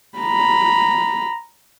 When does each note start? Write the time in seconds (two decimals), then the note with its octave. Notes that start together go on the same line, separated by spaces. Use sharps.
0.18 A#5 B5